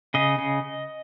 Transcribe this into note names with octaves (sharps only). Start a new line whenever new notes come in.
C#3 D#5
C#3